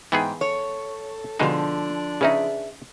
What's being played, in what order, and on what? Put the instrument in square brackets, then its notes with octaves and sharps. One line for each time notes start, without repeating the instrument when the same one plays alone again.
[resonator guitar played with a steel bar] G#2 [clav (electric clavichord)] E3 B3 G#4 [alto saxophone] G5
[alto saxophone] A4 [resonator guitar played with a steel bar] C#5
[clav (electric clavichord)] B2 G#3 D#4 [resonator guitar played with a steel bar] D3 F3 [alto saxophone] D4
[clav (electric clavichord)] C#3 C#4 D#4 [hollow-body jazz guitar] G#4 B4 E5